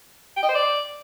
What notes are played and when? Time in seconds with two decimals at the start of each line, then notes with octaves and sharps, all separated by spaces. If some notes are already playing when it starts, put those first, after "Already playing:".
0.37 G5
0.43 D#5
0.49 C5
0.55 D5